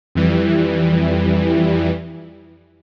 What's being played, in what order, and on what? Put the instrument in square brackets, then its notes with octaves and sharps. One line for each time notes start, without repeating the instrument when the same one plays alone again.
[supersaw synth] F2 E3 G3